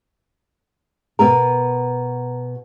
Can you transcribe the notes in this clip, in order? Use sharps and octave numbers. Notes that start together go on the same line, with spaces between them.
B2 B3 A#4 A#5